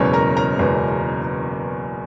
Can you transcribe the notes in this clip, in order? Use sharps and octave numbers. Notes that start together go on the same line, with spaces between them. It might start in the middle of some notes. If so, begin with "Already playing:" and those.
Already playing: F#1 E2 B2 G#3 B3 C#4 C#5
A#4 A#5
A#4 A#5
F#1 E2 B2 G#3 B3